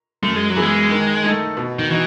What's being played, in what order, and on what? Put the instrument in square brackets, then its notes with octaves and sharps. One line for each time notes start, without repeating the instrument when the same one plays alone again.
[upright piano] F#2 [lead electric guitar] A3
[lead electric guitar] G#3
F#3
[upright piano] E3 B3 E4 G#4
[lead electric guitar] G#3
[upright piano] D#3
A3 D#4 A4
B2
[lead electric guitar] D#3
[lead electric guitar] E3 [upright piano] D#4 F#4